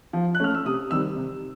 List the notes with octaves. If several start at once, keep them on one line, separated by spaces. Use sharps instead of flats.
F3
F#6
A3 C#4 F6
E6
C3 D#6
D#3 G3 C4 E6
C3